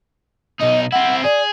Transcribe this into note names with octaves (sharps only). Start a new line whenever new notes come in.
B1 D#4 D#5
C4 E4 F#5
G#4 D5